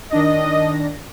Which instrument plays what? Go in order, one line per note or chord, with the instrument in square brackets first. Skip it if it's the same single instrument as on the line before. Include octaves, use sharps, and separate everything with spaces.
[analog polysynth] D#3 D4 A#6 [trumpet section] D#5